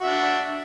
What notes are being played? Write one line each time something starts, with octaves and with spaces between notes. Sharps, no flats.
D4 F#4 E5